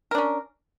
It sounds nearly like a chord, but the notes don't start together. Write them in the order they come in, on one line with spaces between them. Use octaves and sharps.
A#4 D4 C#4